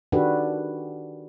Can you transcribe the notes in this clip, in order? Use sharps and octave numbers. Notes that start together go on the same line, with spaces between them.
D#3 D4 F#4 G4 A4 B4